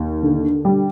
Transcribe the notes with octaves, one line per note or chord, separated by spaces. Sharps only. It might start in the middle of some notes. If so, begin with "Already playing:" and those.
Already playing: D#2
D3
G3